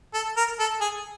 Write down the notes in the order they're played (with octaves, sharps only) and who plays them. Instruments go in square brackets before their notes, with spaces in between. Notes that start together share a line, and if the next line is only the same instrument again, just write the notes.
[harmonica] A4
A#4
A4
G#4